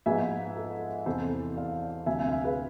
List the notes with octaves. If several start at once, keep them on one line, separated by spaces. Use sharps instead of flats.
G#2 F3 G#3 B3 E5 G#5
A4
E2 C3 E3 A4 C5
D5 F5
D2 C3 F3 E5 G#5
E5 G#5
F5
E5 G#5
G#4 B4